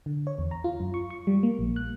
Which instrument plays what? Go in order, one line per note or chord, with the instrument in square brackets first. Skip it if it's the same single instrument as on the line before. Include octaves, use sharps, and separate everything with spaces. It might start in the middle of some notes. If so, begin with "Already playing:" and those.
[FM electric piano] D3
C#5
E2
A#5
F4
F#2
C#6
C#6
G3
A#3
A#1
F#6